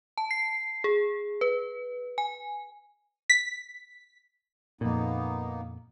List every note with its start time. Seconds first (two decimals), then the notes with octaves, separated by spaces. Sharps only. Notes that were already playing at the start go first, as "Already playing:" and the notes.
0.17 A5
0.31 C7
0.84 G#4
1.41 B4
2.18 G#5
3.30 B6
4.81 F2 A#2 A#3 B3 D#4